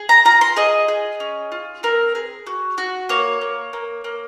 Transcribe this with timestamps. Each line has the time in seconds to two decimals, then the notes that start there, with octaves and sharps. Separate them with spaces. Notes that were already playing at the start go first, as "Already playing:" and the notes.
Already playing: G#4
0.09 A#5
0.25 F4 A#5
0.41 C6
0.56 G#4 D#5
0.88 G#4
1.20 C#4
1.52 F4
1.83 C4 A#4
2.15 G#4
2.47 F#4
2.78 F#4
3.09 A#3 C#5
3.41 A#3
3.73 A#3
4.04 A#3